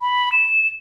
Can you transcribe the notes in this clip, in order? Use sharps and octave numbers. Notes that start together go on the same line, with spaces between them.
B5
E7